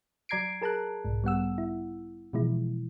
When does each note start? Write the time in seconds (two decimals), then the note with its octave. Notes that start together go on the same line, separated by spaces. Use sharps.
0.29 F#3 D5 A#5 G#6 C7 D7
0.62 G#4 A#4 A5 A#5 F#6
1.05 B1 G#2
1.24 G3 B3 F#5 E6
1.58 E4
2.33 B2 E3 F3 G#3 E4